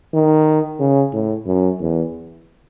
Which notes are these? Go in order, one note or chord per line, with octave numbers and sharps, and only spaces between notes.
D#3
C#3
A2
F#2
E2